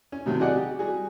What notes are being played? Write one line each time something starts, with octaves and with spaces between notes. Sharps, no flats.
C#4
A2 C3 D#3 F#3
F#4 G#4 D5 D#5 F#5
G4
G3 F#4 G#4